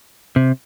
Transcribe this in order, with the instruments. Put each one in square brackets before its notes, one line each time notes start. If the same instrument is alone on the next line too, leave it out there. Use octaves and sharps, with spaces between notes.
[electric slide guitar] C3